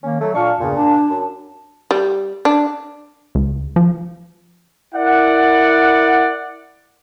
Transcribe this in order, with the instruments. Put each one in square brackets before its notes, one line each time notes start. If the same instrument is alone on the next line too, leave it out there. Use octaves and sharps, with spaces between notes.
[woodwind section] D#3 A#3 [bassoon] C#4
[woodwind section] F#3 [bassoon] A3
[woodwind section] A#2 F5 C#6 [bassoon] D4 [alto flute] A5
[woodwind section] E2 G2 C#3 [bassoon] A#2
[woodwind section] D4 [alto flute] A5
[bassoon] F#2
[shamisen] G3
D4
[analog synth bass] C#2
F3
[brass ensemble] E4 A#4 D5 F#5